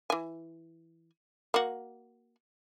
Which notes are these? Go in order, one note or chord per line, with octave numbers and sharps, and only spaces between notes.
E3 G#5
A#3 F#4